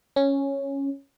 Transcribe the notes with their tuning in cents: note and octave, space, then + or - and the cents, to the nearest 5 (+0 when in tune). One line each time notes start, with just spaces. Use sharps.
C#4 -5